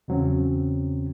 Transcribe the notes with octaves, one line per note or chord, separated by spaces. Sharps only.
E2 C#3 F#3 C4 C#4